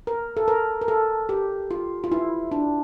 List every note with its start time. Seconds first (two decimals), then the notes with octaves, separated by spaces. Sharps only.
0.07 A#4
0.37 A4
0.48 A#4
0.81 A#4
0.88 A4
1.29 G4
1.71 F4
2.04 F4
2.12 E4
2.51 D4